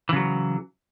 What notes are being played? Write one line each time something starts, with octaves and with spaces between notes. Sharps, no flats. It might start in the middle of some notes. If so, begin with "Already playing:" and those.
C#3 E3 F#3